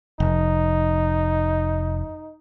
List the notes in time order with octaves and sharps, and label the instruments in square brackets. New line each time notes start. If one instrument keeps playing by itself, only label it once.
[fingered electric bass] F1 [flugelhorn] D#4